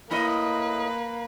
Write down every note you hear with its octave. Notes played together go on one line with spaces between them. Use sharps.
A2 A#3 E4 B4 D#5